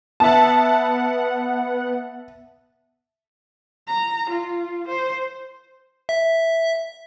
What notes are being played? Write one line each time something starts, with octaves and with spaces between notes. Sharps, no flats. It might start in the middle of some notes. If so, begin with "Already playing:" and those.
B3 E5 F#5 A5
A#5
F4
C5
E5